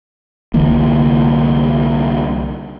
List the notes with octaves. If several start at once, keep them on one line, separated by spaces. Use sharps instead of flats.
C2 D3 E3 A#3